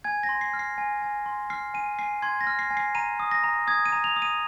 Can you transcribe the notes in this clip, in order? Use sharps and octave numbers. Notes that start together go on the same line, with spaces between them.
G#5 G#6
A#6
C6
C7
F6
C7
G#5
G#5
C6
F6 C7
G#5 D#7
G#5 C7
C6 G#6
A#6
F6
C7
G#5
C7
A#5 D#7
D#6
A#6
A#5
D#6 G#6
D#7
A#5
F7
D#6
D#7